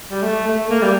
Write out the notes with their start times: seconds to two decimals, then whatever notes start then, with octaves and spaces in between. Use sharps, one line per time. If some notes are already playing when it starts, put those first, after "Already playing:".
0.11 G3
0.22 A3
0.47 A3
0.70 A#3
0.82 G3